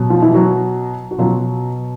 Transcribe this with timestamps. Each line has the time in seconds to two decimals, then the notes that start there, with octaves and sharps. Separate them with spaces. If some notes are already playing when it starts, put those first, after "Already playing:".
Already playing: B2 F#3
0.10 F3 F4
0.22 E3 E4
0.34 F#3 F#4
1.11 F#4
1.18 B2 F3 F#3 F4